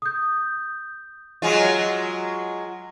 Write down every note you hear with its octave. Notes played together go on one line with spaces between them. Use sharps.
D#6 G6
F#3 G#3 F4